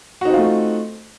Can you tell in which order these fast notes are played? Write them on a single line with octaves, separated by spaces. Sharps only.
F#4 D#4 C4 F4 A3